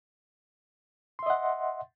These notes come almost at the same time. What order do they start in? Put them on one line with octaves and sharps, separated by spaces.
C6 E5 D#5 F#5